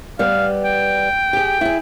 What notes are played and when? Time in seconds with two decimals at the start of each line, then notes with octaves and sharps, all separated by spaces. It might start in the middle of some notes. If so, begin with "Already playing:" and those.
0.19 G3 B3 F5
0.63 G5
1.33 G4 G#4
1.61 E4 G#4